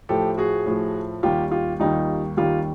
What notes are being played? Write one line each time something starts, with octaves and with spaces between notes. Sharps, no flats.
A2 F3 G4 A4
F#4 G#4
A2 F3
D#2 D#3 G3 F4 G4
F4 G4
D#2 D#3 G3 D#4 F4
D#2 D#3 G3 F4 G4